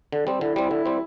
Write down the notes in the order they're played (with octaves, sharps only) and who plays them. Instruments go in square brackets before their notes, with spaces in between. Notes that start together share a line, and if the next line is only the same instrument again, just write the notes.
[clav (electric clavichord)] D3
G3 C4
[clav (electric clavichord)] D3 [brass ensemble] E4
[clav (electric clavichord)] G3 C4
D3
G3 C4